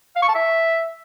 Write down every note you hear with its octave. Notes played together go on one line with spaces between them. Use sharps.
F5
C#6
A5
E5